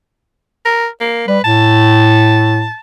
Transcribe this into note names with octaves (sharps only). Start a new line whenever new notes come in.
A#4
A#3
G3 B4
A2 A5